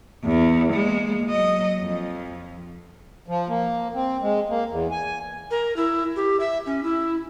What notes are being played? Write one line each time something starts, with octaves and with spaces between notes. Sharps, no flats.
E2
G#3 A#3
F#3 D#5
F2
F3
A#3
C4
G#3
A#3
E2
G#5
A#4
E4
G4
E5
C#4
E4